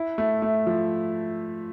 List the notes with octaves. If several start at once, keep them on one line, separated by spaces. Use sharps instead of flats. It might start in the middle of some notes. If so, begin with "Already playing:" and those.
Already playing: E4
A3
A3
F3